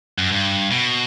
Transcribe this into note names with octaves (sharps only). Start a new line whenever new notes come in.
F#2
G2
B2